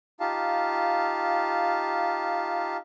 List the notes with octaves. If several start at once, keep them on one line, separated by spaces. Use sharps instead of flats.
D#4 F4 G4 F5 A5